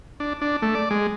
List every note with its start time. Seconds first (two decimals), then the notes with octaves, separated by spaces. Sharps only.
0.20 D4
0.41 D4
0.62 A3
0.75 D5
0.91 G#3